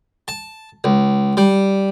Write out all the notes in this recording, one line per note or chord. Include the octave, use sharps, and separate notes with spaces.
A5
C#2
G3